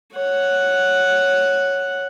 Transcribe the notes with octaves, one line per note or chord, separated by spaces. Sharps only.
C#5 F#5